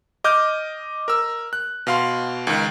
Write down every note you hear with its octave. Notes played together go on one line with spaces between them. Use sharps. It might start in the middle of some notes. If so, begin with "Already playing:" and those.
D#5 D6 F6 G6
A#4 E6
F#6
B2 F5 C6
C#2 D#3